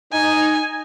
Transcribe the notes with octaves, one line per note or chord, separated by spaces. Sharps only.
D#4 G#5